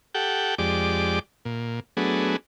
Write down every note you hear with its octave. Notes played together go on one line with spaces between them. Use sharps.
G4 A4 F#5 G5
F2 G#3 G4 D5 D6
A#2
F#3 A3 B3 D4 G#4